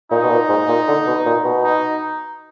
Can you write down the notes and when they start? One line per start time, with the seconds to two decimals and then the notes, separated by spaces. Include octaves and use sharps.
0.11 A#2 D#4
0.23 B2
0.30 A#2
0.49 G#2
0.68 A#2
0.88 D3
1.07 B2
1.26 A#2
1.44 B2
1.64 D#4